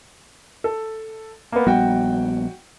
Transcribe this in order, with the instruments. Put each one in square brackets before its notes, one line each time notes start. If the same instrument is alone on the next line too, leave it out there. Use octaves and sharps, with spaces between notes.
[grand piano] A4
A#3 B3
[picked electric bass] A#1 G3 B3 [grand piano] F#4 G5